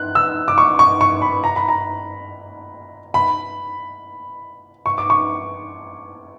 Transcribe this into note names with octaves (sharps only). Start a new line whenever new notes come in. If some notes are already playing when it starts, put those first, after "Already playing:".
Already playing: F#6
E6
D6
C#6
C#6
C#6
B5
A#5
B5
A#5
B5
C#6
D6
C#6